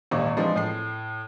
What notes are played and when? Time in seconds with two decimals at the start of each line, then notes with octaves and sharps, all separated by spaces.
0.11 D#1 G#1 A#2 D#4 C#6
0.37 E3 F3 G#3 C4 D4 D#4
0.56 A2 C7